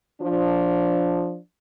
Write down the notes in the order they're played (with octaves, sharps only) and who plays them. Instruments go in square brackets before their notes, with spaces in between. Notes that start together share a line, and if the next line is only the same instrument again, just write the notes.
[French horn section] F3 D4